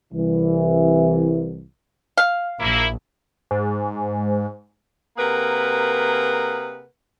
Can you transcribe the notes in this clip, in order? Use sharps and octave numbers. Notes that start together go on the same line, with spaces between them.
C2 E3
F5
A#1 A#3 E4
G#2
C3 A#3 G#4 A#4 B4 F#5